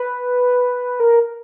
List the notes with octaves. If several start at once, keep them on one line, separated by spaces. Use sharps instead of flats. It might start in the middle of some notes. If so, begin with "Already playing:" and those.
Already playing: B4
A#4